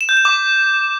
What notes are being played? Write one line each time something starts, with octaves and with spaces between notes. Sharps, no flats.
E7
G6
E7
D6